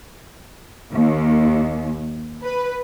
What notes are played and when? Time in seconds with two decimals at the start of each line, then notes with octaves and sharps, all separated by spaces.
0.93 D#2
2.42 B4